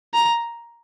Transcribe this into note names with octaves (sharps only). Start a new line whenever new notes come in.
A#5